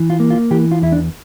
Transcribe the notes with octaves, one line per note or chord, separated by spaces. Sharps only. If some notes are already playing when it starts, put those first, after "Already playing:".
Already playing: E3
F4
A#3
F4
E3 G4
F4
E2 E4
D4